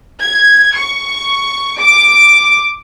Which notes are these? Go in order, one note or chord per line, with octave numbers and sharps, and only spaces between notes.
G#6
C#6
D6